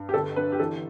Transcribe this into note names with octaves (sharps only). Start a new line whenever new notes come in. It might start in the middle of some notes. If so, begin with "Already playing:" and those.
Already playing: G2
G4
G1 A4
D3 B4
G4
E3 A4